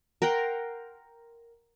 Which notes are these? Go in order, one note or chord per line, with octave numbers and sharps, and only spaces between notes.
A#4 F#5 G5 C6